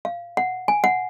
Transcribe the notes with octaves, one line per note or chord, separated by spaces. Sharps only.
F5
F#5
G#5
F#5